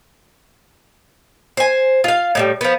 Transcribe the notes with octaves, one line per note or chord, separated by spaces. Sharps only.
C5 G#5
F4 F5
A2 D3 G3
F3 B3